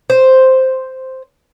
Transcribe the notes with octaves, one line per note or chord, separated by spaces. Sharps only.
C5